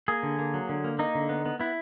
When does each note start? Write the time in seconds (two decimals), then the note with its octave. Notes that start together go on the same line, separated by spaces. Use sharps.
0.08 A#3 G#4
0.23 D3
0.39 A#3
0.54 F#3
0.69 D3
0.84 A#3
0.99 A#3 D#4
1.15 D3
1.29 B3
1.46 B3
1.60 B3 E4